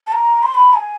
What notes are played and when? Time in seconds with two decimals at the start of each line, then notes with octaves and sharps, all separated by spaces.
0.07 A5
0.12 A#5
0.43 C6
0.55 B5
0.75 G#5